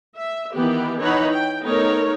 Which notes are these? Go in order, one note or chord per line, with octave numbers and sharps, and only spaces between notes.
E5
D#3 E3 B3 G4
E3 D#4 C#5 F#5 B5
G5
A3 B3 D#4 A#4 C#5